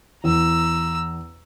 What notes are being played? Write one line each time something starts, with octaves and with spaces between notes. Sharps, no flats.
E2 A#5 E6